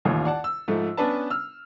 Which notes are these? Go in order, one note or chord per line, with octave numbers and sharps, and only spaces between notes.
A1 D#2 F4
D5 F#5 A5
E6
G#2 F3 A3
B3 C#4 D4 B4 A5
E6 F6